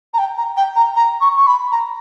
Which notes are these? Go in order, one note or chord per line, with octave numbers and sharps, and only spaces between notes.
A#5
G5
A#5
G5
A#5
A#5
C#6
C#6
B5
A#5